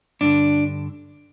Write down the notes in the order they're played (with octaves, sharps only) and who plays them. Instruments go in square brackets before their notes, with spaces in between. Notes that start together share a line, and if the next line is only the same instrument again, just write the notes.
[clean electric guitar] G2 D3 D4